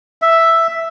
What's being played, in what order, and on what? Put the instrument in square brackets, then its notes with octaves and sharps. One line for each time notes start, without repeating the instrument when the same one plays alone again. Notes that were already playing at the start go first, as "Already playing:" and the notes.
[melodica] E5